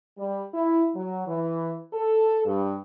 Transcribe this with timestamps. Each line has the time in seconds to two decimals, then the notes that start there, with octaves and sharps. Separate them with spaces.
0.18 G3
0.54 E4
0.94 F#3
1.26 E3
1.93 A4
2.45 G2